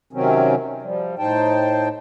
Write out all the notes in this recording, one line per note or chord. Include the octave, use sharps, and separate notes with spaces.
C3 D#3 F#3 C4 C#4
F3 G3
A2 D#4 C5 G5 A5